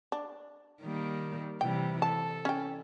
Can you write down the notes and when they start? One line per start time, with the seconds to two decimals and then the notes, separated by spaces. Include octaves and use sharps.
0.12 D4
0.82 D#3 G3 A#3
1.61 C3 E3 G3 G5
2.02 A4 A5
2.45 C#4 G5